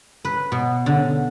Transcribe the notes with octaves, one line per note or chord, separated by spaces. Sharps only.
B4
B2
D3